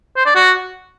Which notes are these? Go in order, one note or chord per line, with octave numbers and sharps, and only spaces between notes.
C5
D5
F#4